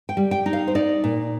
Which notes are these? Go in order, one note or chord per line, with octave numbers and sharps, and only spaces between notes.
G5
G3
G5
D#4
F5
C5
D#4 D5
A#2